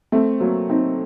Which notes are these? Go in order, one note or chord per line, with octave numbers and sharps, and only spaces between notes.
A3 C4
F#3 A#3
C4 D#4